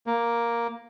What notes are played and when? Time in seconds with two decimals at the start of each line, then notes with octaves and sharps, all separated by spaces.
0.07 A#3